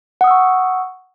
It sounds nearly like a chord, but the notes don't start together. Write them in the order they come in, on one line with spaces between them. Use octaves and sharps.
F#5 D#6 E6 C#6